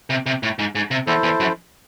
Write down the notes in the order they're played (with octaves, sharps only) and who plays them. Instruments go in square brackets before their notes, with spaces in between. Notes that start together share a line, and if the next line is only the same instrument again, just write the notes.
[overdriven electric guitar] C3
C3
A2
G#2
G#2
C3
[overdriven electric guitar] E2 [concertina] E4 A4 C5
[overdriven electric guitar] E2
F#2